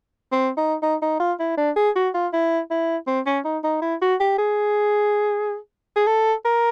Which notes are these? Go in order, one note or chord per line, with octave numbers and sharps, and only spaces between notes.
C4
D#4
D#4
D#4
F4
E4
D4
G#4
F#4
F4
E4
E4
C4
C#4
D#4
D#4
E4
F#4
G4
G#4
G#4
A4
A#4